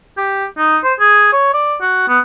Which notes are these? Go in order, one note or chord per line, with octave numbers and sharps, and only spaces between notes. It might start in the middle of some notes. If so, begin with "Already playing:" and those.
G4
D#4
C5
G#4
C#5
D5
F#4
B3